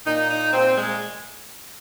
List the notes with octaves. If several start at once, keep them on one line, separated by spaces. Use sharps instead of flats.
A#2 D#4
D#4
A#2 C4
G#3